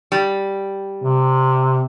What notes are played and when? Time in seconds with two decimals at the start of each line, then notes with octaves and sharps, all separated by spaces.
0.12 G3
1.04 C3